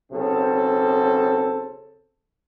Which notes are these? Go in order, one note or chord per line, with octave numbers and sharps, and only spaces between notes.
B1 C#3 C4 A4